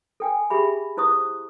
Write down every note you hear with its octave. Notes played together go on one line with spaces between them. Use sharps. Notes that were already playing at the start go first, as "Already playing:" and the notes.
A4 G5 G#5
G4 G#4 E5 B5
E4 C5 C#6 D#6